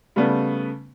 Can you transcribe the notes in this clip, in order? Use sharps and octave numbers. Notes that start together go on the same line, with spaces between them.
C#3 G3 A3 B3